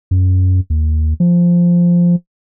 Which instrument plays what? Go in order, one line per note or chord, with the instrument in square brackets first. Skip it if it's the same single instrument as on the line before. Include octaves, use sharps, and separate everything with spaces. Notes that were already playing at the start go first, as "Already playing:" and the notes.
[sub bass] F#2
D#2
F3